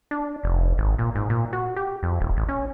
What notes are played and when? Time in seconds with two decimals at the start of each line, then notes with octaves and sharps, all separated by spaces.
0.11 D4
0.43 F1
0.78 G#1
0.99 A#2
1.15 G#2
1.30 A#2
1.53 F#4
1.76 G4
2.03 F2
2.20 D#1
2.37 A1
2.49 C#4